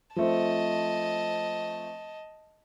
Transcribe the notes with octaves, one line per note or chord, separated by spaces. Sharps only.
F3 A3 C4 D#5 A5